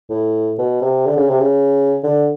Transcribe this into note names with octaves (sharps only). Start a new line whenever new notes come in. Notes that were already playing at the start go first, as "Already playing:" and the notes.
A2
B2
C3
D3
C#3
C3
C#3
D3